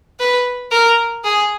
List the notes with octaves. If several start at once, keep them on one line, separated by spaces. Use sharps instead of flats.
B4
A#4
G#4